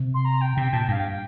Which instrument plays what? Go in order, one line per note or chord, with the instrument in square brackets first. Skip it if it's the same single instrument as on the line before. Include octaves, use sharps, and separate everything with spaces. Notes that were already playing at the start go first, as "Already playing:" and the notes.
Already playing: [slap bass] C3
[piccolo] C6
A#5
G5
[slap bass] C3 [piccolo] G5
[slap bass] A#2 [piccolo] A5
[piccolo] G5
[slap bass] G2 [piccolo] F5
[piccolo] G5